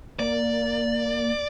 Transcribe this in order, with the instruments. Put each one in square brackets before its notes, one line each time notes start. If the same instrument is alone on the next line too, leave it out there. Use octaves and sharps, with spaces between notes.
[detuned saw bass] A#3 [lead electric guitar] D5